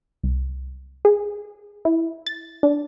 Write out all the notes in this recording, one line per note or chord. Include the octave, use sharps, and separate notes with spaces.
C2
G#4
E4
A6
D4